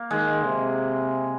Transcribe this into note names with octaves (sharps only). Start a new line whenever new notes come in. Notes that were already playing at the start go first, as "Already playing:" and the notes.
Already playing: A#3
D#3 G#3
C3